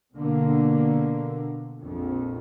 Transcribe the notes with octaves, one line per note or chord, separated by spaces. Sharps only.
B2 D3 A#3
A#1 F2